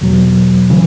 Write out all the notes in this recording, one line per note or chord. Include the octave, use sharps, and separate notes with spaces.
E2 B2 F#3
C#3 E3